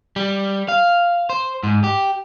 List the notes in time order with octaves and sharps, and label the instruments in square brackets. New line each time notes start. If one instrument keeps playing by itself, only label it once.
[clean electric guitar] G3
F5
C5
G#2
G4